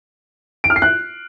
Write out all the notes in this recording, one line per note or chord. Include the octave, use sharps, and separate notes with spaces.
D7
F6
C7
F#6